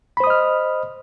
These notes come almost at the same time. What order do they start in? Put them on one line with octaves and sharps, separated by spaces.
B5 C5 D#6 D#5 F6